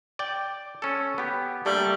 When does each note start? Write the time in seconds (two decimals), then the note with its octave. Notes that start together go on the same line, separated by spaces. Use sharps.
0.19 D5 G5
0.82 C#4 A4
1.18 B3 G4
1.66 G3 A3 A#3 D4